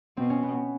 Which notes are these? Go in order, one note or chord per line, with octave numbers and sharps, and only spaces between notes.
B2 C4
C#4
B3